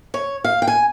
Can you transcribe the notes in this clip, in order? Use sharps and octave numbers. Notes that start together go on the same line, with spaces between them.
C#5
F5
G5
G#5